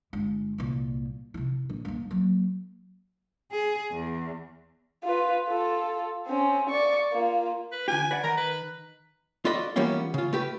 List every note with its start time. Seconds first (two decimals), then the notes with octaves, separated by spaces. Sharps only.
0.13 G1 G#3
0.58 C2 A#2
1.34 C3 E4
1.69 A#1
1.85 G2 A#3
2.11 F#3 A#3
3.51 G#4
3.92 E2
5.04 F4 B4
5.49 F4 A4
6.27 C4 C#4
6.70 D5 C#6
7.13 A#3 F4
7.72 B4
7.88 D3 F4 G4 G#5
8.11 B4 D5 F#5
8.23 D#3 A#4 A#5
8.37 B4
9.45 F4 F#4 A4 D5 D#5 B5
9.76 E3 G3 A#3 B3 C#4 F4
10.14 C#3 F4
10.33 A3 G4 B4